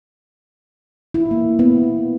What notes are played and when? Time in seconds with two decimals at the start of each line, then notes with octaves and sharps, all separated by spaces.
1.14 E4
1.31 A#3
1.59 B3